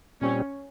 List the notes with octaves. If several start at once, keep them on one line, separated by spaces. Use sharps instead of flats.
A#2 G3 C4 C#4